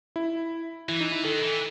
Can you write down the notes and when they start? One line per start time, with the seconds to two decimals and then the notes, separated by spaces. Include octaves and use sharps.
0.16 E4
0.89 E3 E4
1.01 D#4
1.12 E4
1.24 D#3 A4
1.43 E3